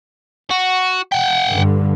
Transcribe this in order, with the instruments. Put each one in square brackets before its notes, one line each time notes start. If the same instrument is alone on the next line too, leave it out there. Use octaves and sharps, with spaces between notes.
[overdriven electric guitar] F#4
F#5 G5
[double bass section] G2 D3